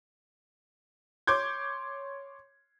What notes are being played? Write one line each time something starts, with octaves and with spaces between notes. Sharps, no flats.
C#5 C6 D6 G6 G#6